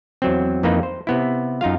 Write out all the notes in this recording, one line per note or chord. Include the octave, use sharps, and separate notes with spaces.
E2 F#3 C4
F2 E3 A#3 C4 D#4 B4
C5
C3 B3 E4
F#2 D#4 F4 F5